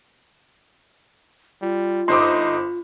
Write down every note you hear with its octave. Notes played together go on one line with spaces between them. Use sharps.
G3 F4
G1 D#4 C5 C6 D6 D#6